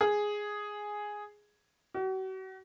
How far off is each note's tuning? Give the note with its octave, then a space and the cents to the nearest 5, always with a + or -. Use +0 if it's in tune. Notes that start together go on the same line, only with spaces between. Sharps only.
G#4 +0
F#4 +40